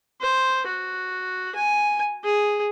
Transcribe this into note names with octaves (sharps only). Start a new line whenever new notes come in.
C5
F#4
G#5
G#4